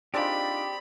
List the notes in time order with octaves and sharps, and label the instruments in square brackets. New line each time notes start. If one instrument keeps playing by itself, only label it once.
[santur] C4 G#4 D5 [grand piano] D4 D#4 F4 [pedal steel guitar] G4 [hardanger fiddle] B5